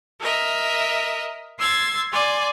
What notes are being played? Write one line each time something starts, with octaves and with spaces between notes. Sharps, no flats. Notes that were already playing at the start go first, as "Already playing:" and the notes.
A#4 D#5 E5
C6 E6 G#6 A6
D5 G#5 C6